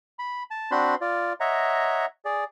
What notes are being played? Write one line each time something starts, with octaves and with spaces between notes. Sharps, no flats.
B5
A5
C4 D4 F#4 C5 B5 C6
F4 D5
C#5 D#5 E5 F#5 A#5
G#4 D5